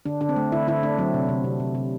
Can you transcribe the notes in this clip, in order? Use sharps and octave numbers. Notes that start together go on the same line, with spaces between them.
D3 D4
D3 D4
C4
A3
D3 E4
D3 E4
A3 D4
F#3 C4
C3
C3
C3
C3
C3